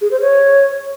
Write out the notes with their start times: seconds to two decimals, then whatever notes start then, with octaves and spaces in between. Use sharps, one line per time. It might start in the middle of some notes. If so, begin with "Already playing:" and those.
0.01 G#4
0.11 C5
0.21 C#5